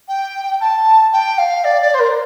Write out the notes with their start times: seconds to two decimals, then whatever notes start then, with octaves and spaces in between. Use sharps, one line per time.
0.08 G5
0.60 A5
1.12 G5
1.38 F5
1.64 D5
1.82 D5
1.94 C5
1.99 A#4